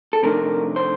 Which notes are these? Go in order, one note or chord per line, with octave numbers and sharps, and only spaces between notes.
A4
F2 C3 D#3 A3 D4 A#4
C5